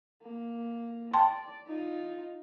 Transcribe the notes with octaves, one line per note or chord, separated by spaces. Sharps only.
A#3
D5 G5 A5 C6
D#4 F4